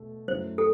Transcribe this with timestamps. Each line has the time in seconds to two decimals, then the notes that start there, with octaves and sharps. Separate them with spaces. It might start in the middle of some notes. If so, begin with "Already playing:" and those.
Already playing: B2 A3
0.28 F#2 F#3 A3 E4 C5
0.58 A4